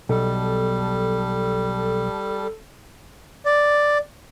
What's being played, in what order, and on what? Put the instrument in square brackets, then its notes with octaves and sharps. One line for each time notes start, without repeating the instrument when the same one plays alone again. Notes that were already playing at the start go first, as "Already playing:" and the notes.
[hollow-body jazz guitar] B1 [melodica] G3 [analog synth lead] A4
[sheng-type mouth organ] D5